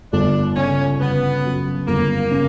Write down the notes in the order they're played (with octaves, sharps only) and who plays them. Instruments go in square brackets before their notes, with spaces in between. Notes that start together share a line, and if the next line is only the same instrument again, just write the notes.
[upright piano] G1 [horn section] D4
[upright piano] C#3 [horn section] C#4
[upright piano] G1 [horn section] B3
[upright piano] F#2
[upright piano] G1 [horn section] A#3
[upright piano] C#3